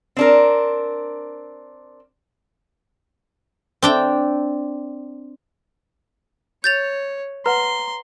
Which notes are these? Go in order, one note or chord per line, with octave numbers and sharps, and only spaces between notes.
C4 D4 A#4
C4 D4 G5
C#5 G6 A6 F7
B4 F#5 A#5 C6